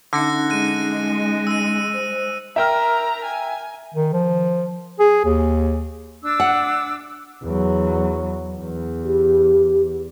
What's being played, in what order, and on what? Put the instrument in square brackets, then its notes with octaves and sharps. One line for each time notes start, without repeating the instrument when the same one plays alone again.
[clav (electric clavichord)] D3 [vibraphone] C#4 D#4 E5 [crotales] F#6 A#6 C#7
[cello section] G#3 [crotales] F#6 D#7
[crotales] E6 D#7
[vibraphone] C5
[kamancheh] A#4 A#5 [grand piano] E5 G5 F6
[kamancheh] G#5
[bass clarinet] D#3
F3
G#4
D#2
[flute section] D4 D6 E6
[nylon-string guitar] F#5
[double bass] E2 F#3
E2
[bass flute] G4